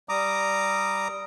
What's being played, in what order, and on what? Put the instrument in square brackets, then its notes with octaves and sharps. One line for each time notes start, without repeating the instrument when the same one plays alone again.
[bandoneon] G3 A#5 D6 D#6